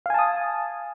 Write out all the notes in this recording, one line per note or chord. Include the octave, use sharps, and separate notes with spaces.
F5 G#5 A5 D#6